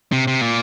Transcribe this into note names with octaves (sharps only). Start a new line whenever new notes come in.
C3
C3
A#2